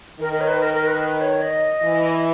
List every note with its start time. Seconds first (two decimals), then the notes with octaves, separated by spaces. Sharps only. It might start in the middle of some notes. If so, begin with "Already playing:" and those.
0.20 D#3 A#4
0.33 A#4
0.41 C#5
0.47 B4
0.61 A#4
0.74 A#4
0.87 B4
1.01 B4
1.21 C#5
1.42 D#5
1.82 E3